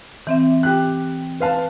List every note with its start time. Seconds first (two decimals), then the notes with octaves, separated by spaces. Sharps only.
0.27 E3 C4 E5
0.63 G4 F#6
1.40 B4 F5 A5